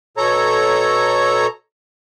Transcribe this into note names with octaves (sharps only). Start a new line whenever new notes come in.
B2 A4 C#5 A#5